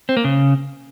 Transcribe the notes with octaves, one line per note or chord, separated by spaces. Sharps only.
C4
A#3
C#3